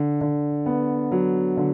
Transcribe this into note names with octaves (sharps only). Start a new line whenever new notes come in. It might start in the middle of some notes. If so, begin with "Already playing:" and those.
Already playing: D3
D3
B3
F#3
D3